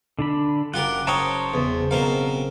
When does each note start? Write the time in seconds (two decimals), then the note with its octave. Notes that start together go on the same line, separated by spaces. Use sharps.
0.19 D3 D4 B5
0.74 F#1 F4 G4 A#4 F#5
1.07 C5 C#5 F5 G5 A5 A#5 D#6
1.54 E2 C#3
1.91 B2 C4 A#4 F5